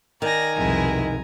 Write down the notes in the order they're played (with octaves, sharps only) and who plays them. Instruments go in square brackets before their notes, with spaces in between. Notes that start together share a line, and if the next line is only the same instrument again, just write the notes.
[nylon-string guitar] D#3 [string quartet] D5 A#6 [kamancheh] G#5 A#5
[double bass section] C2 B2 [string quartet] F2 G#3 E4